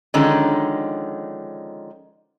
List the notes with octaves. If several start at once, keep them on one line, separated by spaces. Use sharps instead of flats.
D3 D#3 F3 G#3 C#4 D#4